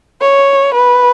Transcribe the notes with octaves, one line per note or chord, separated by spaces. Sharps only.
C#5
B4